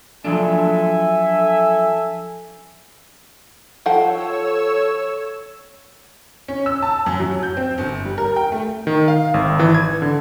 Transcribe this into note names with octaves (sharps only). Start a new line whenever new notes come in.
F3 F#3 D4 A4 E5 G#5
F3 A4 C#5 F#5 G5 E6
C#4
E6
A5
F#2
F#3
G6
C4
G1
G3
A#4
G5
A3
D#3
F5
G#1
E3
G#6
D3